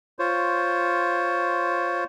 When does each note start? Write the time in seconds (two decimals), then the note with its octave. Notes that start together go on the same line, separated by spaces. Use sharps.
0.19 F4 C5 C#5